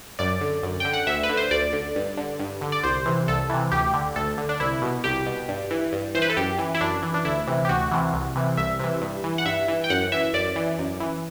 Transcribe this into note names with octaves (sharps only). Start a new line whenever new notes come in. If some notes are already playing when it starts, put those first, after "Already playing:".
F#2 D5
D3
F#2
D3 G5
F#5
D2 E5
B4
D3
C5
D2 D5
D3
G2
D3
G2
D3
D5
C2 C5
C3 E3
C2 A4
C3 E3
D2 G4
D3
D2 A4
D3
D4
C2 E4
B2
C2 G4
B2
G2
E3
G2
E3 C5
B4
A4
F#2 G4
E3
E4
F#2 D4
E3
D4
D2 E4
C3 E3
G4
D2 F#4
C3 E3
C2
C3 E3
C2 E5
C3 E3
G2
E3
F#5
G2 E5
E3
G5
F#2 F#5
E3 E5
F#2 D5
E3
F#2
E3